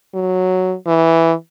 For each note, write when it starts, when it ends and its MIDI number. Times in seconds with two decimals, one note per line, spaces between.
0.14 0.75 54
0.87 1.33 52